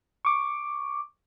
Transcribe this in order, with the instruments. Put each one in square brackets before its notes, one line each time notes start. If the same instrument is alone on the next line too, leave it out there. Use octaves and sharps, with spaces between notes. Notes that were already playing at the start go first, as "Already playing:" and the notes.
[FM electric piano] C#6 D6